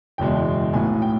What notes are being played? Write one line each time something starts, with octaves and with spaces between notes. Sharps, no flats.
F#1 E2 B2 G#3 G5
B1 A2 F#3 B3 G#5
G5